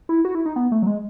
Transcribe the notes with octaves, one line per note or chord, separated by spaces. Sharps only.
E4
F#4
E4
D#4
B3
A3
F#3
G#3